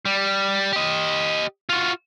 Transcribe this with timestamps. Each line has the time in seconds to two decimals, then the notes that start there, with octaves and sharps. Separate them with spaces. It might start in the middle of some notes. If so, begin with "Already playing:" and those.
0.05 G3
0.73 G4 D#5
1.69 F4 F#4